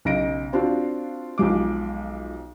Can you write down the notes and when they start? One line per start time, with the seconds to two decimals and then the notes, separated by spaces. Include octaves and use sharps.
0.05 B1 C#3 D#5 A#6 D7
0.53 C4 D4 F4 F#4
1.38 B1 F3 G#3 D6